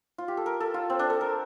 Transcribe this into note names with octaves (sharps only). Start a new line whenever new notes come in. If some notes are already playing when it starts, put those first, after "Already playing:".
F4
G4
A4
A#4
A4
F4
C4
D4
A4
A#4